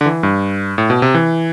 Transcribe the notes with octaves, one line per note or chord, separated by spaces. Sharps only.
D3
E3
G2
A2
B2
C3
E3